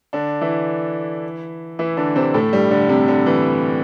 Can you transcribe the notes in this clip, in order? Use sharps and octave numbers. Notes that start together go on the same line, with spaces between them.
D3 D4
E3 E4
E3 E4
D3 D4
C3 C4
A2 A3
G2 G3
D3
C3
D3
E3